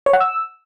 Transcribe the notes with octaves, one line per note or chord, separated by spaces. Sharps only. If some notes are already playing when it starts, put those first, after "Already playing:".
C#5
F#5
E6